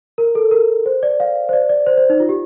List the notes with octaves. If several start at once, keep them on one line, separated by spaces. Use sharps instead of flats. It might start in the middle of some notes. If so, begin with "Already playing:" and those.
A#4
A4
A#4
C5
D5
F5
C5
D5
D5
C5
C5
D#4
F4
G4